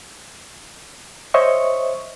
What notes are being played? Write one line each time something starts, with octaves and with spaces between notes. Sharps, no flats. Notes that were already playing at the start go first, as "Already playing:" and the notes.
C5 C#5 D#5 E5 C#6